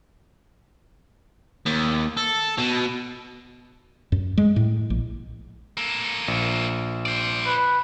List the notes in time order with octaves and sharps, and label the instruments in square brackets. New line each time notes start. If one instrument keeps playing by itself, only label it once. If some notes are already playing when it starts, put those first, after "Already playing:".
[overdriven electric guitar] D#2
A4
B2
[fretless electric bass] F#2
G#3
A2
A#1
[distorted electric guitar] A#3 A4
[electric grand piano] A#1
[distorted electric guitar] C5 D5
[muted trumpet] B4